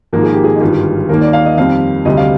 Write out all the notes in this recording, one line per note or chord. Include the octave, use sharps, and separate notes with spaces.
G#1 G#2 F3 A#3 A#4
G#4
G4
G#4
D#4
G#1 G2 D3 G3 F4
D#2 D#3 A#3 A#4
D5
F5
D#5
F2 D#3 G3 C4 F5
D2 C3 G3 D#5
F5